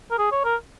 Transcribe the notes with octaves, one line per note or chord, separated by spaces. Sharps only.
A#4
G#4
C#5
A#4